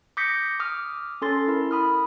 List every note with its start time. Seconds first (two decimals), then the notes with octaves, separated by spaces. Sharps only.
0.17 D6 D#6 G6 A#6 B6 C#7
0.60 D6 D#6 F6
1.22 C#4 A4 C6 A6
1.48 E4 A#4
1.71 B5 D#6 F6